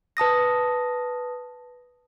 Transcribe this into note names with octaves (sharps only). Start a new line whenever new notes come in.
B4 A5 D#6 A#6